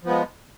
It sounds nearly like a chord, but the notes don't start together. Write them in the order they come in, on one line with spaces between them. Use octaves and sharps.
F3 B3 G#3